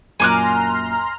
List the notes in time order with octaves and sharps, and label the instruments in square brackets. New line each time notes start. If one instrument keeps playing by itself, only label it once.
[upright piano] F#2 A#2 [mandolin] G#5 D6 F#6 [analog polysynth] A#5 C6 F6